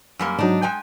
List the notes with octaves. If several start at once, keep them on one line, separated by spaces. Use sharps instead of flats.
F#2 G3 A#3
G#2 F#3 D4 D#4
G#3 G5 G#5